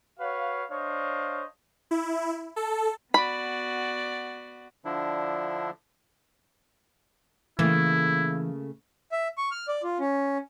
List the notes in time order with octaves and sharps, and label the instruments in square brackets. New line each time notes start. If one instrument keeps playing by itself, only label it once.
[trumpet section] F#4 B4 C#5 F5
D4 C5 C#5 D#5 F5
[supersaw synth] E4
A4
[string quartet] B3 F#4 D5 [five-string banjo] B5
[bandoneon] D3 F3 D4 E4
[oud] C#3 A3 A#3 [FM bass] E3 [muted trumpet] E4
[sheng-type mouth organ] E5
C#6
F6
D5
F4
C#4